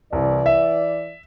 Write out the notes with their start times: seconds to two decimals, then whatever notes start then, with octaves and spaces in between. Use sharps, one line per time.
0.13 C2 E3 D5
0.46 E5